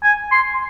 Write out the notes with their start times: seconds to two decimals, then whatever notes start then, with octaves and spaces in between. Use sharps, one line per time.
0.03 G#5
0.32 C6